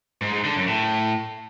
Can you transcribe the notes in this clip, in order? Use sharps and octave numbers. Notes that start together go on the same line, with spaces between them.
G#2
G#2
D3
F#2
A2